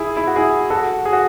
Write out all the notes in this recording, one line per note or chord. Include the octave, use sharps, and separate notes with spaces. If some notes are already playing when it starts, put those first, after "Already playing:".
Already playing: E4 G#4
E4
F#4
E4 G#4
F#4 A4
G#4
F#4